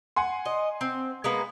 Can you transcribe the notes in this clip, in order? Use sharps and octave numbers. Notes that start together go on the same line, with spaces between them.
F#5 G#5 C6
D#5
C4
G#3 A#3 B3